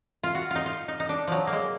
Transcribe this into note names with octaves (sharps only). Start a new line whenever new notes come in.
F4
F#4
D#4 F4
F4
D#4
D#4
D4
F3 F#3
A#3
G#3